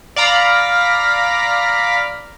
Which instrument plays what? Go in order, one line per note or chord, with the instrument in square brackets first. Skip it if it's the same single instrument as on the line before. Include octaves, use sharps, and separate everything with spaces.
[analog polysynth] D5 F5 A#5 B5